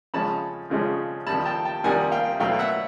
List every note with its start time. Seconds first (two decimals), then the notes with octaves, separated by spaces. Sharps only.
0.14 F2 C#3 F3 G#3 C#4 A5 B5
0.70 F2 C#3 F3 G#3 C#4
1.27 F2 C3 D#3 G3 A5 B5
1.45 G5 A5
1.65 G5 A5
1.84 F2 C3 D#3 G3 F#5 G#5
2.12 F5 G5
2.40 B2 F#3 A3 F5 G5
2.59 E5 F#5